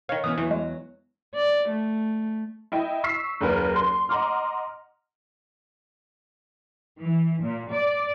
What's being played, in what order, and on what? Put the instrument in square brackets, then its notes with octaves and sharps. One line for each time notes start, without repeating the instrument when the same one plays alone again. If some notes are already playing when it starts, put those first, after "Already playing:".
[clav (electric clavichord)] D#3 F5 [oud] C#5
[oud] E3 B3 C#4 [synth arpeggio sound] D#6
[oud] E2 F#3 [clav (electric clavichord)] E3
[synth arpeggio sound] G#3
[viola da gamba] D5
A3
[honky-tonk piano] E4 D#5 G5
C#6 E6 B6 C7
F#1 D#2 A#4 B4
C6
D#5 F#5 A#5 C6 D6 F6
[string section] E3
A#2
D5